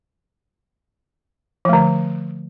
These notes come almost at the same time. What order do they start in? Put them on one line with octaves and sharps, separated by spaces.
F3 A3 D3